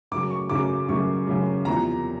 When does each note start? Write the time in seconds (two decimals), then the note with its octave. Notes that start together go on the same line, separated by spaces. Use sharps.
0.11 F#2 C#3 F#3 D6
0.30 C#6
0.50 F#2 C#3 F#3 D6
0.89 F#2 C#3 F#3 C#6
1.27 F#2 C#3 F#3
1.65 E2 C3 F3 A#5